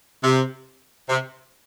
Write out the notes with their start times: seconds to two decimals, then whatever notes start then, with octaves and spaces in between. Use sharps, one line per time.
0.24 C3
1.09 C3